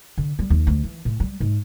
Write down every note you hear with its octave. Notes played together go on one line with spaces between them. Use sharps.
D3
G3
D#2
D2
E3
A2
G3
G#2